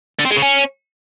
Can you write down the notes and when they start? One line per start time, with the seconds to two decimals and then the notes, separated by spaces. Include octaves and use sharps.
0.19 D3
0.25 C4
0.31 G#3
0.37 C#3
0.42 C#4